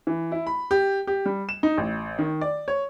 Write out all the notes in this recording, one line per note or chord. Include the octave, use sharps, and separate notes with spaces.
E3
E4
B5
G4
G4
G3
E7
D#4
A1
D#3
D5
C#5